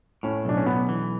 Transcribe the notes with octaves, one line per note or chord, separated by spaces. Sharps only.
A2 C#4
B1 D4
C#4
B1 B3
E3